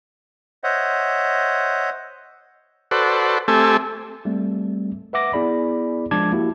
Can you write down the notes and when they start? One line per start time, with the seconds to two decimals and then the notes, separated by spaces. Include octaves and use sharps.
0.64 C5 C#5 D#5 E5 F#5
2.91 F#4 A4 B4 C5 D5
3.48 A3 C4 G4 A4 G#5
4.25 G3 A3 C4
5.13 B4 E5 F#5 D6 A#6
5.33 B3 E4 G#4 D5 B5
6.11 F3 G#3 D4 A5 D6 G#6
6.32 A#3 E4 F#4 G4